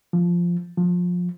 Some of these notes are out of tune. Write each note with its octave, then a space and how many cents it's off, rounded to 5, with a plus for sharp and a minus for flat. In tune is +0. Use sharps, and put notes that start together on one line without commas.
F3 -5
F3 +25